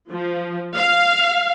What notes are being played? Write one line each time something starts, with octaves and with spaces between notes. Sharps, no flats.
F3
F5